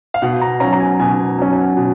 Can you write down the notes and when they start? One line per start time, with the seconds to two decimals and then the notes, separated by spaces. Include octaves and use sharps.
0.14 F5
0.22 B2 F#5
0.41 A#5
0.60 F#3 C#4 A#5
0.73 A#5
0.80 G#5
1.00 B2 G#5
1.38 F#3 C#4
1.77 B2